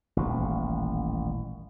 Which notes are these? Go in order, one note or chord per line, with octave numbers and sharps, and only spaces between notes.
D#1 A1